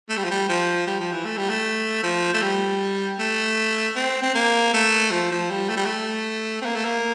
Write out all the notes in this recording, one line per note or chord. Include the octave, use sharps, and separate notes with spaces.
A3
G3
F3
G3
F3
G3
F3
E3
A3
G3
A3
F3
A3
G3
A3
C4
C4
A#3
A3
F3
F3
G3
A3
G3
A3
C4
A#3
A3
A#3